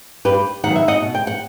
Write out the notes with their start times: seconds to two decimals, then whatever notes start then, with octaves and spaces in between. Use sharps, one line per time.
0.25 G2 G4 B4
0.64 D#3 F#3 B3 F#5
0.76 E5
0.88 D#5 F#5
1.02 B2
1.15 G5
1.27 F#5